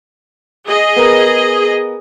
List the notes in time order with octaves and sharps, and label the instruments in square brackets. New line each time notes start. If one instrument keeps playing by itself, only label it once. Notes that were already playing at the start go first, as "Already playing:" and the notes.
[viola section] G#4 D#5
[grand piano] B3 A#4